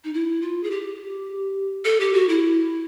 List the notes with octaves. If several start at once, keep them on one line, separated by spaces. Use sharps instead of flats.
D#4
E4
F4
G#4
G4
A4
G4
F#4
E4